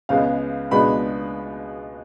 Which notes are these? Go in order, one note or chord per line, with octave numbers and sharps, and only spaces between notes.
C#2 C#3 G#3 B3 F5
C#2 B2 G#3 B3 D4 B5